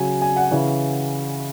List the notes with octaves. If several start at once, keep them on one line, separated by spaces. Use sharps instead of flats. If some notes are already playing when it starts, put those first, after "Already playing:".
Already playing: C#3 F#3 G#5
G#5
F#5
C#3 E3